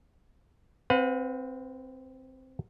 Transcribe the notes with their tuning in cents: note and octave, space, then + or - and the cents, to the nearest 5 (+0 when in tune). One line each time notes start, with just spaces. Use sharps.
C4 +0 B4 +25 F#5 -45